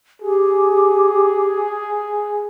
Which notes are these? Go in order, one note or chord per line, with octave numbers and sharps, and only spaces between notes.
G4 G#4